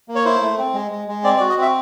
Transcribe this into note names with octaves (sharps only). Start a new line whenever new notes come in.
A#3
C#5
E4 C5
A3
C4
G#3
G#3
G#3
C4 D5
D5
F#4
D#5
C4 E5